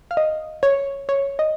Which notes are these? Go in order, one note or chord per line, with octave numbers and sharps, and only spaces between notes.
F5
D#5
C#5
C#5
D#5